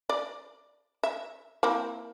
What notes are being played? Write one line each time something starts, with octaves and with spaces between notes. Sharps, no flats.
D5
E5
A#3 C4 E4